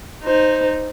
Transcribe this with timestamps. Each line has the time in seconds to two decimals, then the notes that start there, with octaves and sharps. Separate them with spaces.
0.24 D#4 C5